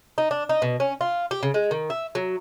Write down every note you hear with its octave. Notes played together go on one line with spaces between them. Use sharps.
D#4
D4
D#4
B2
C#4
F4
G4
C#3
G#3
D#3
E5
F#3